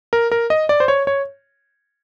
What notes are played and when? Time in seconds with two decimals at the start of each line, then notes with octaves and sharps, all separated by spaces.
0.13 A#4
0.32 A#4
0.50 D#5
0.69 D5
0.80 C5
0.88 C#5
1.07 C#5